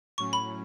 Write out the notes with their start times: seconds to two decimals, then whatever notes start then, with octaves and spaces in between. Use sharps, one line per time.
0.18 A2 F#3 C#4 C#6
0.33 B5